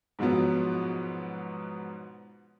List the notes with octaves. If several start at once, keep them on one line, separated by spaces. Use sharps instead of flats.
G#2 B2 F3 F#3 B3